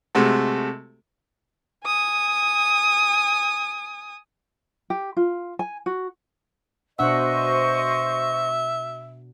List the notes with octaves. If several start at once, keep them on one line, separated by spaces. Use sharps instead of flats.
C3 G#3 A3 F#4 A4
G#5 D#6
G4
F4
G#5
F#4
B2 D4 C5 D#5 E5 F#5 C#6